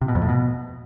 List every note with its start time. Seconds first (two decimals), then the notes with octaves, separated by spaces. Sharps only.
0.01 C3
0.08 B2
0.15 F2
0.22 A2
0.29 B2